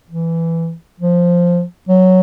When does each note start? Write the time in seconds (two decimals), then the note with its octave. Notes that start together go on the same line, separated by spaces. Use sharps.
0.10 E3
1.00 F3
1.88 F#3